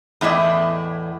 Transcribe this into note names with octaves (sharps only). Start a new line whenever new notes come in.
E2 A2 E4 D5 D#5